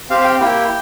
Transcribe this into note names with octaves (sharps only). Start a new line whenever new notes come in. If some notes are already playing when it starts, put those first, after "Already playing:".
C4 G4 F5
F5
G5
A#3 E4 G4 G5